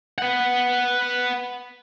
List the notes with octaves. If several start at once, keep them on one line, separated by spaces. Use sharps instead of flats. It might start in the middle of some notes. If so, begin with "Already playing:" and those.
B4 F#5